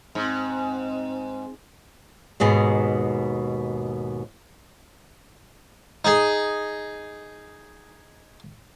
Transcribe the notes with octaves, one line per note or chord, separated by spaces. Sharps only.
G#2 C4
D#2 G#2 B2 G#4
D#4 G#4